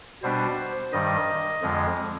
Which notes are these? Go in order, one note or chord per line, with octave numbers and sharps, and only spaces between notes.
B2 G3 B3 D4 C5
G2 D#3 G3 D#5
F2 D3 F3 G#3